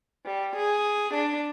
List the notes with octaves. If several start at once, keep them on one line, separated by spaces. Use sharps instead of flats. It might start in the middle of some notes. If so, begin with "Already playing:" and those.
G3
G#4
D4